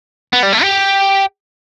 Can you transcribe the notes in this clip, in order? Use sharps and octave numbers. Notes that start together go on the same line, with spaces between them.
B3
G3
A3
G4